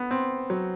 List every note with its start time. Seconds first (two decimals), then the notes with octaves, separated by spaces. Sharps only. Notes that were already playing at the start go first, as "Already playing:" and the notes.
Already playing: B3
0.11 C4
0.50 F#3